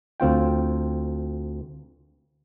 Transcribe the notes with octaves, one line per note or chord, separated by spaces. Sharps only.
D2 C4 F4 G5